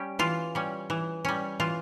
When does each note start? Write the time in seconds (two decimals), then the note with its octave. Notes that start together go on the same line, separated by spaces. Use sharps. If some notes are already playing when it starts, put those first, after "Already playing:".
Already playing: G3 C#4 G4
0.19 E3 F4
0.55 G3 C#4
0.90 E3
1.25 G3 C#4
1.60 E3 F4